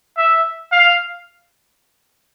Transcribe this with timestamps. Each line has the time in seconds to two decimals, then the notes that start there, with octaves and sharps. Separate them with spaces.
0.17 E5
0.72 F5